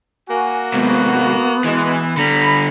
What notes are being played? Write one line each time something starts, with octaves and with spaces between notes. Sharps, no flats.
A#3 F#4 G#5
G#2 C3 B3
B2 E3 G#3
D3 G3 A#5 B5